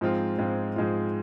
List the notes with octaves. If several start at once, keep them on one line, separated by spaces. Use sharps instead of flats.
G#2 F3 G#3 C4 F4
G#2 F3 G#3 C4 F4
G#2 F3 G#3 C4 F4